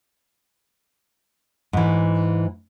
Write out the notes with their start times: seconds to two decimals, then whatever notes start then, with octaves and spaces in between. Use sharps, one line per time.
1.73 G#2 E3